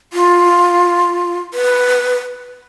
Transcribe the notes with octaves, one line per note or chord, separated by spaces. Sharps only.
F4
B4